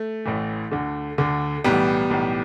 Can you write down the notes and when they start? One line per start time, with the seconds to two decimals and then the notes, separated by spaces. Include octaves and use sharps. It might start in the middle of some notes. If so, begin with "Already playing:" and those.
Already playing: A3
0.25 A1 A2 E3
0.72 D2 D3
1.18 D2 D3
1.64 B1 A2 E3 G3 B3
2.10 B1 A2 E3